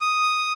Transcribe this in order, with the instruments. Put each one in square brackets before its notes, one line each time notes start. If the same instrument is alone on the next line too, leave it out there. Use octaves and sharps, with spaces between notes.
[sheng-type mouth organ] D#6